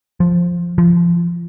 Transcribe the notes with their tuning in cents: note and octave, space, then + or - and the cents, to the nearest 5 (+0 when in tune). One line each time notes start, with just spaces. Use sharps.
F3 +5
F3 -30